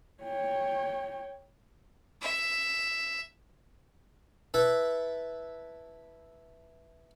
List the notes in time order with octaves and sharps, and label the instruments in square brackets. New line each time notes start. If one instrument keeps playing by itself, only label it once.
[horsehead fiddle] C#5 G5
[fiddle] E5
[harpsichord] E4 A4 B4 E5